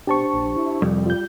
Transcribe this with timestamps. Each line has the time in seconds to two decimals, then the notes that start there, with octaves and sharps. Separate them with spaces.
0.07 B2 D4 G4 C5 A5 C#6
0.33 A#1
0.56 E4
0.82 C2 F2 G3
1.06 G3 F4 G6